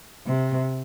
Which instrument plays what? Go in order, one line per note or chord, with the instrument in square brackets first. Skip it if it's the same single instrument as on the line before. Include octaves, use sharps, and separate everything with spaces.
[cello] C3